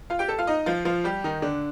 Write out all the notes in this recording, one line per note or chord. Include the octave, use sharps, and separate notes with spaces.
F4 F5
G4 G5
A4 A5
F4 F5
D#4 D#5
F3 F4
F3 F4
G3 G4
D#3 D#4
D3 D4